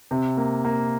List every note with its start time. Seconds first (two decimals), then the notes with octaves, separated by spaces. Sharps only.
0.11 C3
0.37 A#3
0.65 A#3